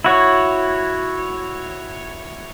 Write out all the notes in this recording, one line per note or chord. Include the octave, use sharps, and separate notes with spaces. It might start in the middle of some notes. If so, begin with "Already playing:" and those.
E4 F#4 C#5